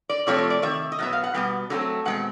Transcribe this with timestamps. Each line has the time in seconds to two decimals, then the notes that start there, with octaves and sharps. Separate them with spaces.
0.09 D5
0.27 C3 F3 A3 C4 C#5
0.38 C#5
0.50 D5
0.62 C3 D#3 E5
0.92 D#5
0.99 B2 F#3 B3 E5
1.13 F5
1.24 F#5
1.34 B2 G3 B3 G5
1.70 D3 F#3 A3 C4
2.05 B2 G#3 C4 F#5